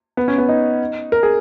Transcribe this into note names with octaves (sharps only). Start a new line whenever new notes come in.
B3
C#4
B3
D#4
A#4
G#4